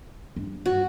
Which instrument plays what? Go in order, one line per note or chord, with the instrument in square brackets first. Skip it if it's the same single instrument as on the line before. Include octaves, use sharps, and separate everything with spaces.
[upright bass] G2
[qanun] F#4